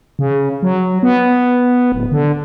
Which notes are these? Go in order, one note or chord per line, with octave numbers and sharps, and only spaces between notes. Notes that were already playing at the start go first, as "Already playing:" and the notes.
C#3
F#3
B3
D1
D3